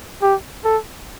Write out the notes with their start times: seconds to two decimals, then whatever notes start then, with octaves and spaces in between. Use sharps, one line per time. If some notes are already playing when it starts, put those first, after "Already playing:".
0.22 G4
0.65 A4